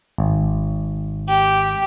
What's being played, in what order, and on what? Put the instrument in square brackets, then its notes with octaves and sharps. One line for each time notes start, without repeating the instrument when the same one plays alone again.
[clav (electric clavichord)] G#1
[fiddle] G4